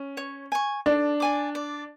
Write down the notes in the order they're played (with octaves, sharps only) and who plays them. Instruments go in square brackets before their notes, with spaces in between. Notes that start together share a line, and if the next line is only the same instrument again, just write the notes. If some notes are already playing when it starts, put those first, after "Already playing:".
Already playing: [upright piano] C#4
[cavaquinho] C#5
G#5 C#6
[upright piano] D4 [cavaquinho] A4
[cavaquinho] D5 G#5 D6
D5